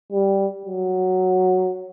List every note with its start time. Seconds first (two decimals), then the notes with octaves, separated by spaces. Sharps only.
0.12 G3
0.66 F#3